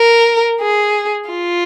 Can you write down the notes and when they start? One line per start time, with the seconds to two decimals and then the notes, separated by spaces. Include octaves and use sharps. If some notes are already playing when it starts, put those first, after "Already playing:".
Already playing: A#4
0.61 G#4
1.30 F4